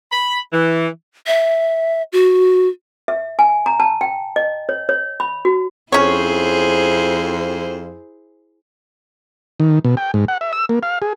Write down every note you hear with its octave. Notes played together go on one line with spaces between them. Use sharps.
B5
E3
E5
F#4
E5
G#5
A#5
A5
G5
D#5
C#5
C#5
B5
F#4
F2 C#4 E4 G#4 C5 C#5
D#3
B2
G5
G#2
F#5
E5
E6
A#3
F5
G#4